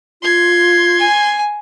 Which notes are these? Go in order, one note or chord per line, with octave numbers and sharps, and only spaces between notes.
F4 C6 G#6
G#5